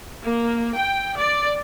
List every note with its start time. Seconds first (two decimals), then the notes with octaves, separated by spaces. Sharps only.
0.24 A#3
0.76 G5
1.17 D5